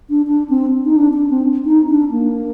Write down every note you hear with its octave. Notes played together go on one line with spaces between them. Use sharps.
D4
D4
C4
D#4
D4
D4
C4
D#4
D4
A#3